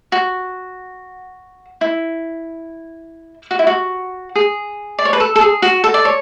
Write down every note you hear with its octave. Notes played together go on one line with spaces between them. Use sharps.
F#4
E4
F#4
E4
F#4
G#4
D5
C#5
B4
A4
A4
G#4
F#4
A4
D5
C#5